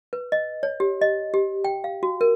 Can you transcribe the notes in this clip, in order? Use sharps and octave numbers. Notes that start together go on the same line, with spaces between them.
B4
D#5
C#5
G4
D#5
G4
G5
F5
F#4
A#4